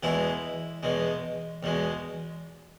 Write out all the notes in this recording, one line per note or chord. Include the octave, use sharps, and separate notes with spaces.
E2 B2 G#3 E4
E2 B2 G#3
E2 B2 G#3